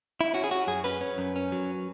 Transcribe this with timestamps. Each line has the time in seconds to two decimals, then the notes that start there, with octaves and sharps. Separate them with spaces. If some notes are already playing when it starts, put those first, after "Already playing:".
0.21 E4
0.34 C#4 F#4
0.44 G#4
0.51 C#4 F#4
0.67 F#2 G#4
0.84 C#4 B4
1.01 C#4
1.18 F#2
1.36 C#4
1.52 F#3